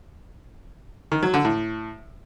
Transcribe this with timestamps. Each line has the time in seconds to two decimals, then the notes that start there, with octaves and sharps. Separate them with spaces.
1.12 D#3
1.23 F#3
1.34 D3
1.45 A2